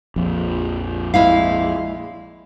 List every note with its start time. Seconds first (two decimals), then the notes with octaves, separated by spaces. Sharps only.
0.16 A#1 F2
1.14 G#3 E4 F5